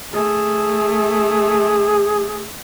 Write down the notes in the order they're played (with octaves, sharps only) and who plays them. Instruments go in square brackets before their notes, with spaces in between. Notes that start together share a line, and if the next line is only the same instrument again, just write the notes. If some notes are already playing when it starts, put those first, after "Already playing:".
[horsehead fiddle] A3 [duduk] G#4